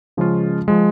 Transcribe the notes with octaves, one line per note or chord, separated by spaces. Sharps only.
C#3 F3 G#3 C#4 F4
F3 G#3